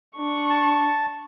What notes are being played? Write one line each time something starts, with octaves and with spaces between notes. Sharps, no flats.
D4 C#6
A5